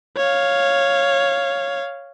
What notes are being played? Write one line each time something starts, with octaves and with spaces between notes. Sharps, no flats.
C#5 F5